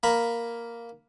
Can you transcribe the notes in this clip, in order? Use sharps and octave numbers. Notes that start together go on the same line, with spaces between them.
A#3 A#5 B5